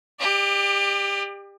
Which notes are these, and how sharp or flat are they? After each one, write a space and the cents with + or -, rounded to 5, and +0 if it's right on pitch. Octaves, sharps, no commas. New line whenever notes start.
G4 +25 D5 +40